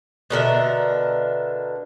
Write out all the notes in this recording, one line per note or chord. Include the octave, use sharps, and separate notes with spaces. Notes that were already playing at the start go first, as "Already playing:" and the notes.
B2 D3 A#4 E5